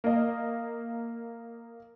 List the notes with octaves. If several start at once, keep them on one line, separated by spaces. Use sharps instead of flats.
A#3 D#5